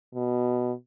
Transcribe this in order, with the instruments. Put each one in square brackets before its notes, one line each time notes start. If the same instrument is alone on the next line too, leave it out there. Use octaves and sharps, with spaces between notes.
[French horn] B2